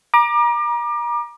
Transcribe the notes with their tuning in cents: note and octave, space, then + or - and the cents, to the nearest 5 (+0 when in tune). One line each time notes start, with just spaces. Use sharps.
A#5 +35 D6 +30